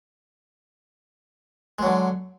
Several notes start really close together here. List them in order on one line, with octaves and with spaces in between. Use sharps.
G#3 F#3 D3